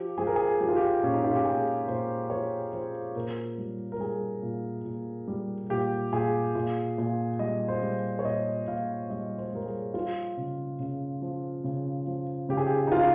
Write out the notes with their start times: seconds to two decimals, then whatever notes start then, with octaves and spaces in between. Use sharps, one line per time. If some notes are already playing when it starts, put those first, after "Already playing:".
Already playing: F3 G4
0.18 F3 G#4
0.27 A#4
0.36 G#4
0.61 F3 G4
0.69 F4
0.76 G4
1.03 A#2 C#4
1.14 D#4
1.25 F4
1.35 G4
1.45 A#2 G#4
1.88 A#2 C5
2.30 F3 C#5
2.73 F3 C5
3.15 A#2 A#4
3.58 G3
3.92 A#4
4.00 G3 G#4
4.43 A#2
4.85 A#2
5.28 G3
5.70 A#2 G4
6.13 A#2 G#4
6.55 A#2
6.98 A#2
7.39 G3 D#5
7.68 C5
7.82 G3
8.19 C#5
8.24 A#2 D#5
8.68 A#2 F5
9.10 G3 D#5
9.38 C5
9.53 G3 A#4
9.66 G#4
9.94 F3 F4
10.37 C#3
10.79 C#3
11.22 F3
11.64 C#3
12.07 F3
12.49 C#3 G4
12.57 G#4
12.67 G4
12.87 D#4
12.92 F3 F4